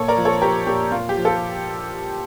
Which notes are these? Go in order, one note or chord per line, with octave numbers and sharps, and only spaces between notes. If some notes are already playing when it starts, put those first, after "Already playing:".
Already playing: A#2 A4 C#5
A#4 D5
F3
A4 C#5
F3 G4 A#4
A#2 G4
A#2 F4
G4
F3
F4 A4